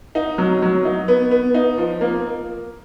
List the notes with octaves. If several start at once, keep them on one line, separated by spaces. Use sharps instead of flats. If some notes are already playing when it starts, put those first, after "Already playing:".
D#4
F#3
F#3
D#4
B3
B3
D#4
F3
A#3